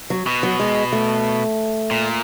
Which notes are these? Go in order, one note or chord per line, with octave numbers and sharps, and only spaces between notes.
F#3
B2
F#3
G#3
A3
A#2